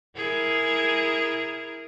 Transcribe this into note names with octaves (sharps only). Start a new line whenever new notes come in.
E4 G#4 A#4